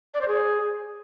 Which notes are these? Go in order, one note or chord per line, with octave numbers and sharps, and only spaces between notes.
D5
C5
G#4